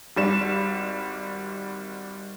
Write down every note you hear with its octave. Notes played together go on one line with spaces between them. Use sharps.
G#1 G3 E7